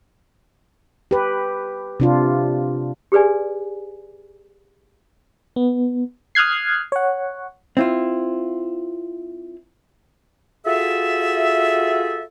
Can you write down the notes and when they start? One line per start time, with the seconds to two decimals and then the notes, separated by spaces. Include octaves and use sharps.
1.11 G4 B4
2.00 C3 D4 F4
3.12 G4 G#4 B4 D5 G#5
5.56 B3
6.35 D#6 F6 F#6 G#6 C7
6.92 C#5 F#5
7.77 C4 E4 F4
10.66 F4 F#4 G#4 A4 E5